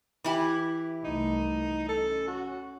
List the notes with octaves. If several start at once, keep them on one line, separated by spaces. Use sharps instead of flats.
E3 E4 G4
C2 A3 D#4
C#4 A4
F#4